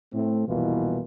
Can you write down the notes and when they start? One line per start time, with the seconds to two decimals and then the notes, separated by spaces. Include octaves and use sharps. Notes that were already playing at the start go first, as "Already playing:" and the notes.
0.14 A2 A3 C4
0.47 C2 F2 B2 E3 A#3 F4